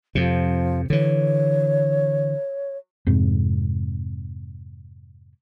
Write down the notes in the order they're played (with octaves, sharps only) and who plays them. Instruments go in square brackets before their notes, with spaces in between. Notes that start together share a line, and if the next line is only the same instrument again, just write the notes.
[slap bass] F2 C3 [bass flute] F3
[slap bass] D3 E3 [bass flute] C#5
[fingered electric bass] F2 G#2 C3